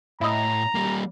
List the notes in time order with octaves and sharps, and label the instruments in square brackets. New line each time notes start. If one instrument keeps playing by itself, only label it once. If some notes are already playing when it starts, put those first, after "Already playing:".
[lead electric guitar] A2 [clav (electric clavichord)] E4 D#5 [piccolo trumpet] A#5
[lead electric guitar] G3 A#3